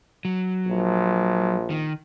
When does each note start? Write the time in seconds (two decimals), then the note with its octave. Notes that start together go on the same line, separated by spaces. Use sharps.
0.25 F#3
0.67 A#1
1.70 D#3